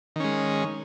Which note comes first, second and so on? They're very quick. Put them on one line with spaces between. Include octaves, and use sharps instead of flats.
D#3 C#4 G#3